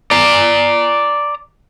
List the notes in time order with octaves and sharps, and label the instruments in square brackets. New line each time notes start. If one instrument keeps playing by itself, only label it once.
[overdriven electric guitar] D5 A#5